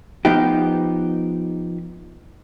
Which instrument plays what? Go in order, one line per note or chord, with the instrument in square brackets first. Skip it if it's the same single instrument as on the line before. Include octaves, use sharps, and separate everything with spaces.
[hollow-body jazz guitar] F3 B3 D#4 G4